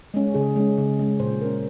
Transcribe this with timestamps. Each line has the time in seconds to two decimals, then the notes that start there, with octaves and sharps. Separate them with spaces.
0.14 G#3 C#4
0.34 C#3 G#4
0.56 G#3 C#4
0.78 C#3
0.99 G#3 C#4
1.20 A#2 C5
1.41 G#3 C#4 A#4